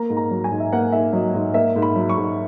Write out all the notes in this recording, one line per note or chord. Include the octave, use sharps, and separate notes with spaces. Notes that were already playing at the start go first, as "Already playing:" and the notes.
Already playing: A#3 A#5
G#2
A#5
F#3
G#5
G#2
E5
A#3 F#5
G#2 E5
F#3 D#5
G#2 D#5
A#3 E5
G#2
B5
F#3
C#6
G#2